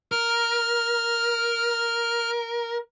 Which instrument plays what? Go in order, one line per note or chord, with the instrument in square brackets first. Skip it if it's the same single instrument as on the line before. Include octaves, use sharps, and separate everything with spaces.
[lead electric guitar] A#4 [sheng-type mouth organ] F6